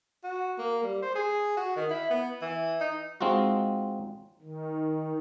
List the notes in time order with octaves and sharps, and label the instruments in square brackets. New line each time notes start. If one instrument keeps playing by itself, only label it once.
[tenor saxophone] F#4
A#3
G3
C5
G#4
F#4
D#3
E4
B3
E3
D#4
[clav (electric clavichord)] G#3 C4 D#4 F4 F#4
[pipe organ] D#3